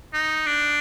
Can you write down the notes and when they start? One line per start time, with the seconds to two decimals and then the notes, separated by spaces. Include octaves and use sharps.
0.14 D#4
0.47 D4